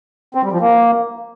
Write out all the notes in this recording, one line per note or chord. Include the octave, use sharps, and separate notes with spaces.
C4
G3
F3
A#3